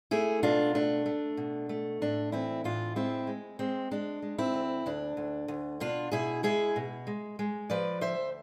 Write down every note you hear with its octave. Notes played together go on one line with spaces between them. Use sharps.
A3 E4 G#4
B2 D4 F4
A3 D4
A3
B2
A3
A2 D4
E3 C4 E4
A2 D4 F4
G#3 C4 E4
G#3
G#3 C4
G#3 D4
G#3
C4 E4
D2
D2 D4
D2
D2
B2 D4 F4
B2 E4 G#4
G#3 E4 G#4
B2
G#3
G#3
F3 B4 D5
D2 C5 E5